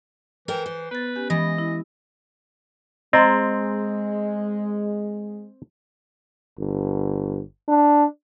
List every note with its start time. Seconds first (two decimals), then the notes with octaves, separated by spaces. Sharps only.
0.48 E3 A#4 C5 G5
0.66 C5
0.91 B3 B4 A6
1.16 C#4 G4 G#5
1.30 E3 G#3 D#5 B5 A6
1.58 E4
3.13 G#3 C4 D#5 A#5 C6
6.59 G1
7.68 D4